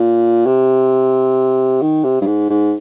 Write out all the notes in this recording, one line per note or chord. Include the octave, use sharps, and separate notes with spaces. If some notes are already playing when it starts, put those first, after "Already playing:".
Already playing: A#2
C3
D#3
C3
G2
G#2
G#2